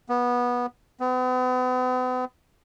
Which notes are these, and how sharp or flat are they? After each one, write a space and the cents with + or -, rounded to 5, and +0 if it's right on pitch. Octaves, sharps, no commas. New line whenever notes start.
B3 -15
B3 +45